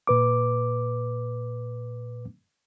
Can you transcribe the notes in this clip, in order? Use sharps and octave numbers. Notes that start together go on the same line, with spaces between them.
A#2 B4 D6